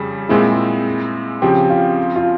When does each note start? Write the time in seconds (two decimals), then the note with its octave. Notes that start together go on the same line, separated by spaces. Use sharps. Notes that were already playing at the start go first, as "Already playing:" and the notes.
Already playing: F2 C#3 G3 G#4
0.29 A#2 G#3 C4 E4 G#4
1.42 C#3 F3 C4 G4
1.70 F4
2.16 F4